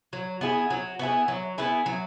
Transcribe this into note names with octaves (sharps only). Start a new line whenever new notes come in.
F#3
B3 E4 G#4
F#3
B3 E4 G#4
F#3
B3 E4 G#4
F#3